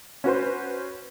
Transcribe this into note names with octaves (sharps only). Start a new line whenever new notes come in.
C#4 F#4 B4 C5